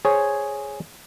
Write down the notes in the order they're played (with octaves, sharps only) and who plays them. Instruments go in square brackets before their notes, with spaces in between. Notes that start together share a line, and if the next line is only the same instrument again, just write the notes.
[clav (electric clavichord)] G#4 C5 C#5